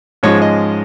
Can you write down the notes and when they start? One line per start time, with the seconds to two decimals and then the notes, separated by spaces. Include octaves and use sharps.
0.23 G#2 F3 G#3 C#4 C#5
0.42 D#5